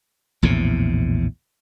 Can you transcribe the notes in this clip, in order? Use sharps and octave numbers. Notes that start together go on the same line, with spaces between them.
A#1 E2 A2 C3